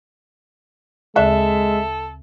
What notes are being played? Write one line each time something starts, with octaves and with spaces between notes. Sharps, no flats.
D2 C#3 G#3 A4 E5 F#6